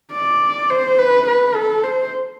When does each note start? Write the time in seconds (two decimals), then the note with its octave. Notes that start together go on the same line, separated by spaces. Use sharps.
0.12 D5
0.70 C5
0.98 B4
1.27 B4
1.55 A4
1.84 C5